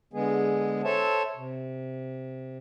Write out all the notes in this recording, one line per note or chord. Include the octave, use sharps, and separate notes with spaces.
D3 G#3 B3 G#4
A4 C5 C#5 E5 A5
C3